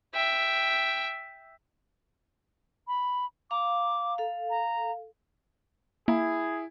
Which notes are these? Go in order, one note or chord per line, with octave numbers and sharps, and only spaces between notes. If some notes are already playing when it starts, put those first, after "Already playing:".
E5 G5
B5
F5 A#5 D6
A4 F5
A#5
A#3 E4 G#4